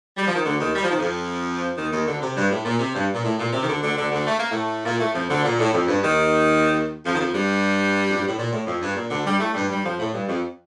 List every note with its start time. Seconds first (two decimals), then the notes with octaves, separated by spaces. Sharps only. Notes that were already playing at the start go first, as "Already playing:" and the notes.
0.17 G3
0.27 F3
0.36 D#3
0.45 D2 D3
0.60 D#2 D#3
0.75 G3
0.83 F3
0.90 D#3
0.98 F2 F3
1.77 D#2 D#3
1.92 D#2 D#3
2.06 D2 D3
2.21 C3
2.36 G2
2.51 A2
2.65 A#2
2.80 C3
2.95 G2
3.14 A#2
3.24 A2
3.39 A#2
3.53 C3
3.63 D#3
3.68 D2 D3
3.83 D2 D3
3.97 D2 D3
4.12 D2 D3
4.27 A3
4.39 A#3
4.51 A2 A3
4.85 A#2 A#3
4.99 A2 A3
5.14 F2 F3
5.30 D2 D3
5.43 A#2
5.59 A2
5.73 F2
5.88 G2
6.02 D#2 D#3
7.05 F2 F3
7.15 D#3
7.20 F2 F3
7.34 G2 G3
8.07 F2
8.17 G2
8.27 A2
8.37 A#2
8.52 A2
8.66 F2
8.82 G2
8.95 A#2
9.10 D2 D3
9.25 G2 G3
9.40 A2 A3
9.54 G2 G3
9.69 G2 G3
9.84 F2 F3
9.99 A2
10.14 G2
10.28 F2